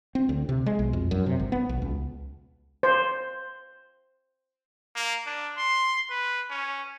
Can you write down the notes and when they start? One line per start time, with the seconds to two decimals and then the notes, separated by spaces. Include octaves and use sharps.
0.15 C4
0.29 D2
0.49 C3
0.66 G#3
0.79 B1
0.93 F2
1.11 F#2
1.26 C3
1.39 G#1
1.52 B3
1.69 B1
1.82 C#2
2.83 C5
4.96 A#3
5.27 D4
5.58 C6
6.10 B4
6.50 C#4